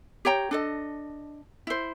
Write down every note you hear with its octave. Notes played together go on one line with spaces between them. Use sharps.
G4 C#5 G5 A#5
D4 A4 D#5
E4 C5